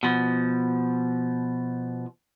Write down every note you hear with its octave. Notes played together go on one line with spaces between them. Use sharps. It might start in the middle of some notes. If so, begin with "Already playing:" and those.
B2 F3